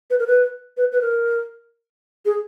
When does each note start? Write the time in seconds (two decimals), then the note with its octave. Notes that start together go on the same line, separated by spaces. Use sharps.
0.10 B4
0.19 A#4
0.27 B4
0.77 B4
0.92 B4
1.01 A#4
2.26 G#4